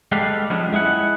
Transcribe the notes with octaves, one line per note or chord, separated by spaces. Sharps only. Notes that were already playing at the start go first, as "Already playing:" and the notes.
G#3 G4 A4 B4 D5 F5
F3 G3 G#3 B3 C#4 D4
G#3 E4 G#4 F#5